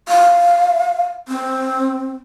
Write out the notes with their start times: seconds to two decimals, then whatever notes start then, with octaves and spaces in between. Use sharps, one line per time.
0.08 F5
1.28 C4